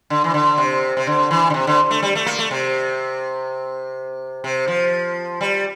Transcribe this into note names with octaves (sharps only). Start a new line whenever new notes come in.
D3
E3
D3
C3
C3
D3
E3
D3
C3
D3
A3
G3
A3
A#3
A3
C3
C3
F3
G3